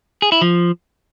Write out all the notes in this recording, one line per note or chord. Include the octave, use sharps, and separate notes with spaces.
G#4
E4
F3